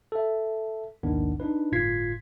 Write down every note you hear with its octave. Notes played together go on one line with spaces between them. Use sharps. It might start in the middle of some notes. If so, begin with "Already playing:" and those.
A4 E5
A#1 D#2 G#2 D#3 B3 D4
D4 D#4 B4
G1 A2 F4 G#6 B6 C7